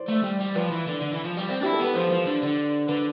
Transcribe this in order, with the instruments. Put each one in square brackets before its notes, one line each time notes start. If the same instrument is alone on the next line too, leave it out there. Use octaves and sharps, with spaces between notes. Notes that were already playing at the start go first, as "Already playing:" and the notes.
Already playing: [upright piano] C5 D5
[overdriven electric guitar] A3
G3
G3
[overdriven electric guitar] F3 [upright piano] B4
[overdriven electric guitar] E3
D3
D3
E3
F3
G3
C4
[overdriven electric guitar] D4 E4 [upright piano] G4
[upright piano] A4
[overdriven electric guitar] B3 [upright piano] B4
[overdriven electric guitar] F3 [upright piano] C5
[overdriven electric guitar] F3
D3
D3
[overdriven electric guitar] D3 [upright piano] B4